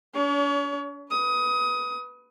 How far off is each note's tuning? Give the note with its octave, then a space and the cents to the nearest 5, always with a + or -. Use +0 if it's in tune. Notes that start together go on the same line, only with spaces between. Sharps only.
D4 -45 C#5 +35
B4 +0 D#6 +20